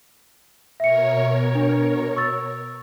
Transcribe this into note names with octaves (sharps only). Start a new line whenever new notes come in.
B2 A#4 C#5 E5 C#7
D4
C#6 E6 A6